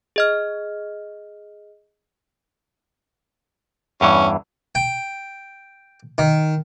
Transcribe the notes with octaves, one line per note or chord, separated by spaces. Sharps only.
G#4 D#5 F6
E2 G2 E3 C#4
G5
D#3